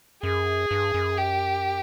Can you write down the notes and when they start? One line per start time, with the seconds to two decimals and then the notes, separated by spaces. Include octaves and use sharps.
0.23 F#2 G#4
0.71 G2
0.94 F#2
1.18 G4